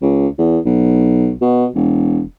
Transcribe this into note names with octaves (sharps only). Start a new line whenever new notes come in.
C#2
E2
B1
B2
E1